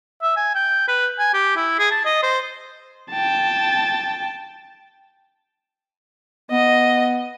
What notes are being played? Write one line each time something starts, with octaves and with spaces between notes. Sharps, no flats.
E5
G#5
G5
B4
G#5
G4
E4
G#4
A5
D#5
C5
G5 A5
B3 D#5